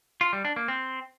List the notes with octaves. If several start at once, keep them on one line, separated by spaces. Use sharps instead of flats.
F4
G3
D4
A#3
C4